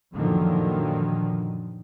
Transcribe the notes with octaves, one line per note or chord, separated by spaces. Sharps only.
F#2 A#2 D3 D#3 F3 F#3